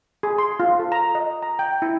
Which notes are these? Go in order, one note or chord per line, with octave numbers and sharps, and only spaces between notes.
G#4
C6
F4
A4
A#5
D#5
A#5
G5
E4